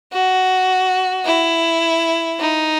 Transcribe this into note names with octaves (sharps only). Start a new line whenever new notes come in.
F#4
E4
D#4